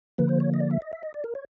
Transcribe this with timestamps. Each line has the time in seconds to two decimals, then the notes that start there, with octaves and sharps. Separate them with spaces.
0.18 D3 F3 A#3 B4
0.29 C5
0.40 C#5
0.54 D#5
0.60 D5
0.71 E5
0.82 D#5
0.93 E5
1.03 D#5
1.14 D5
1.24 A#4
1.35 C#5